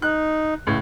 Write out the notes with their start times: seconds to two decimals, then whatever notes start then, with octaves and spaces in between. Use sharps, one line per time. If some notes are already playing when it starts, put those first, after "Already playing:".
0.02 D#4 F#6
0.67 C#2 A2